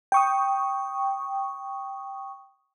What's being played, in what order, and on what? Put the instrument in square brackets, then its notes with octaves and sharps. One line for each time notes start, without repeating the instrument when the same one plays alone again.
[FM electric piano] G5 C#6 D#6